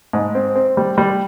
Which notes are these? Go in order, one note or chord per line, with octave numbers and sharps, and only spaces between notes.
G#2
C4
C4
G3
G3